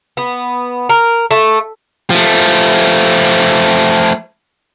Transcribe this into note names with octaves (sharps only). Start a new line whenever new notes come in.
B3
A#4
A3
F3 A3